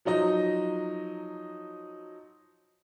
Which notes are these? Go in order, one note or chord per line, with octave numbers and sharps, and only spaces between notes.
F3 F#3 D#4 D#5